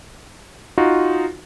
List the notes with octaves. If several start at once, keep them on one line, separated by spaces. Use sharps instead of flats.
D#4 F4 F#4